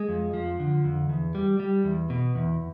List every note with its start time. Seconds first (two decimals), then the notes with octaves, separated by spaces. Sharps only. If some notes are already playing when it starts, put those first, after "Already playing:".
Already playing: G#3
0.09 F2
0.34 F3
0.60 D3
0.84 F2
1.09 E2
1.35 G3
1.60 G3
1.84 E2
2.10 B2
2.35 E2